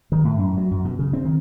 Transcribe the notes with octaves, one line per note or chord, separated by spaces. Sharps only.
D#3
A2
F#2
F#3
F#2
B2
C#3
C4
D#3